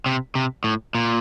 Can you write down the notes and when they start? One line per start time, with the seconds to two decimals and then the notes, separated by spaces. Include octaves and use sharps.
0.06 C3
0.35 C3
0.64 A2
0.95 A#2